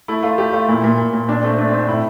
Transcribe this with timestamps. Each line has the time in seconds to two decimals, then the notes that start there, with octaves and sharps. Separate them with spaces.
0.08 A3 E4
0.23 A3 F4
0.38 A3 G4
0.53 A3 F4
0.68 A#2 E4
0.84 A#2
0.98 A#2
1.14 A#2
1.28 A#2 D4
1.43 A3 C4
1.58 A3 D4
1.69 C4
1.73 A3
1.79 D4
1.88 A2 E4